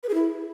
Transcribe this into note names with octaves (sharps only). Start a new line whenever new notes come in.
B4
G#4
E4